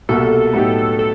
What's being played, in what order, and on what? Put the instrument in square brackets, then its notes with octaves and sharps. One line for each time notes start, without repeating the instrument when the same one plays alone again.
[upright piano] C2 B2 G3 A#3 [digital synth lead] A4
[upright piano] A2 F#3 B3 D#4 G4
[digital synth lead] A4